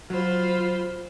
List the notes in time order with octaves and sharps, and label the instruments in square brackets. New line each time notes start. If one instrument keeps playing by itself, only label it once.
[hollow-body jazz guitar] F#3 [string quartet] F4 C5 B5